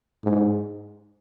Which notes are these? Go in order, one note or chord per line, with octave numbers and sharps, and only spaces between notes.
G#2